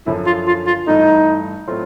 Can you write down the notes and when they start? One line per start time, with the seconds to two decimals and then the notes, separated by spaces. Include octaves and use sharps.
0.06 F#2 D3 F3 E4
0.26 F4
0.47 F4
0.67 F4
0.87 G2 E3 A3 D#4
1.68 A2 F#3 A3 C4 F4